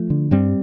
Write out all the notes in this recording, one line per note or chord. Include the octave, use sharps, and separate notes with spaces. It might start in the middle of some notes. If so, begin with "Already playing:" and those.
Already playing: F3 A3
D3
G2 G3 C4